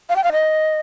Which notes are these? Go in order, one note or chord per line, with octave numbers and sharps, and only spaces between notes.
F5
G5
F5
D#5